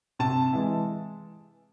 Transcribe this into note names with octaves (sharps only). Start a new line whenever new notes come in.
C3 A5
E3 G#3